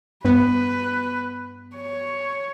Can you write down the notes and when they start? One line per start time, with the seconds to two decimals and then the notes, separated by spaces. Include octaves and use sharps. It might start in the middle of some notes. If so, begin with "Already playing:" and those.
0.24 G2 B3 B4
1.75 C#5